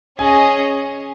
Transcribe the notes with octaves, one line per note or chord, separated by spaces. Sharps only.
C#4 G#4 D#5 G#5